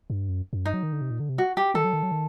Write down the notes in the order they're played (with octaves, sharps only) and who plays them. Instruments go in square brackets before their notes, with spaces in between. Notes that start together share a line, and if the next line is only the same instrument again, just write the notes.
[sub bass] G2
F#2
F#2
[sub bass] G2 [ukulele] D#4
[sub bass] F#3
D#3
D3
C3
A#2
D3
C3
[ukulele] F#4
G4
[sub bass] D#3 [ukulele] A4
[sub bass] F#3
D#3
F#3
D#3